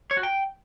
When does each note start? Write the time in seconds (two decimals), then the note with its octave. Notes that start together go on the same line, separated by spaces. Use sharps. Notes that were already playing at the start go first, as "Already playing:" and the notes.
0.11 C#5
0.17 F#4
0.23 G5